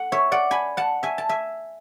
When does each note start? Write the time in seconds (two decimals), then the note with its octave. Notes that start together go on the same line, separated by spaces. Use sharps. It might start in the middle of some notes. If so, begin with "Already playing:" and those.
Already playing: A3 F#5
0.12 C#5 E5
0.32 D5 F#5
0.51 G#5 B5
0.77 F#5 A5
1.03 E5 G#5
1.18 A5
1.29 E5 G#5